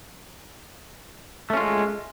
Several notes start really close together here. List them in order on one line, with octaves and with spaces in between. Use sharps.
A3 C#4 F4 G#3